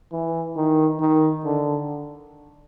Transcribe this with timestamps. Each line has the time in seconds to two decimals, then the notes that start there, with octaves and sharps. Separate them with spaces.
0.12 E3
0.56 D#3
1.01 D#3
1.45 D3